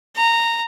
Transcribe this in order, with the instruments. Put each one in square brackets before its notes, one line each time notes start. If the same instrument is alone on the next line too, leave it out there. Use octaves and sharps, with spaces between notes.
[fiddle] A#5